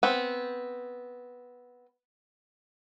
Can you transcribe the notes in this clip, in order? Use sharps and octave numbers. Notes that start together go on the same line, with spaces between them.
B3 C4